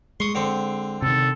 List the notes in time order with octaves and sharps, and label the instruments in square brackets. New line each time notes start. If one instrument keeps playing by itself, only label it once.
[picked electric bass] G#3 [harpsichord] C6 C#6 D#6
[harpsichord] D3 C4
[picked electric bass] C3 D#3 [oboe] A4